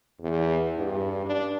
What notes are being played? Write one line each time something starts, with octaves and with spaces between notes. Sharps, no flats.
E2
G2
D4